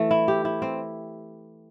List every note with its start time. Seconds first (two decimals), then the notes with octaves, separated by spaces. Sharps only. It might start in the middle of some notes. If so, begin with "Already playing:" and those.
Already playing: E3 A3
0.11 E4
0.28 G4
0.45 E4
0.62 C4